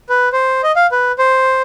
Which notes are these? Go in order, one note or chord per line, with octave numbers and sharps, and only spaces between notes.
B4
C5
D#5
F5
B4
C5